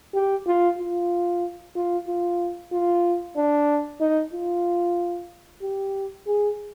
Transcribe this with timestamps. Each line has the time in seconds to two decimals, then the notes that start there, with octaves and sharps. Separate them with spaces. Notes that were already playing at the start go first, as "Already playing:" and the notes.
0.14 G4
0.47 F4
0.79 F4
1.75 F4
2.08 F4
2.72 F4
3.37 D4
4.00 D#4
4.33 F4
5.62 G4
6.27 G#4